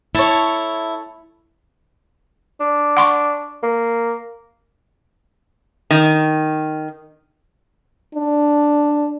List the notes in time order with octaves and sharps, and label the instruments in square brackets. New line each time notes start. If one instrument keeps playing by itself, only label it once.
[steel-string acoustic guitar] E4 [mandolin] A4 C#5
[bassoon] D4
[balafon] F#5 C6 C#6
[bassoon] A#3
[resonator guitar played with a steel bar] D#3
[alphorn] D4